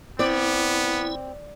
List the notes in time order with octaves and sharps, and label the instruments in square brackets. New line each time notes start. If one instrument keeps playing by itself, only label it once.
[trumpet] B3 [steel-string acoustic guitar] C4 [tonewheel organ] E4 [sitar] D5